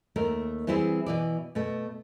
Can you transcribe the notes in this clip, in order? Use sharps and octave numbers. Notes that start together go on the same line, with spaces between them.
D#2 A3 A#4
E3 G3 C4 E4 G4 G#4
B2 E3 D5
B2 A3